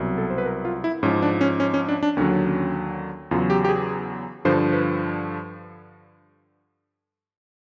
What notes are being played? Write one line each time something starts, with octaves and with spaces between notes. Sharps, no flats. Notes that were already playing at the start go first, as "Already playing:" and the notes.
Already playing: C2 B2 F#3
A4
C5
B4
A#4
F4
E4
G#2 F3 C#4
D4
C#4
C#4
C#4
D4
D4
D#2 D3 F#3 C#4
C#4
E2 C#3 F#3 F4
G4
G4
G#4
G2 D3 F3 C5
B4